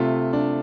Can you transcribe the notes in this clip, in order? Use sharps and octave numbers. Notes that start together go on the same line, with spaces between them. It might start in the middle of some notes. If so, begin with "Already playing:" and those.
Already playing: C3 A3 F4
D4